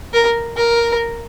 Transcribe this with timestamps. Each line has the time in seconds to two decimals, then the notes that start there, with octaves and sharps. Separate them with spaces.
0.13 A#4
0.56 A#4